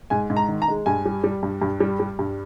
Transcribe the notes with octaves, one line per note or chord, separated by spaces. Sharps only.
G#2 G#5
G#2
A#5
D#3
A#5
G#3
G2 G#5
G3
G3
G2
G2
G3
G3
G2